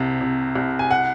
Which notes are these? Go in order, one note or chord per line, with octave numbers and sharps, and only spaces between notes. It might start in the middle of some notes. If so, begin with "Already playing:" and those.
Already playing: C2 C3
C3
C2
G#5
F#5